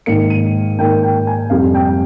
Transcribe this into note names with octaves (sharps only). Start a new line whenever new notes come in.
G#2 D#3 A#3 C#7
D#7
G#2 D#3 A#3 G5
G5
G#5
F2 C3 G3 F5
G5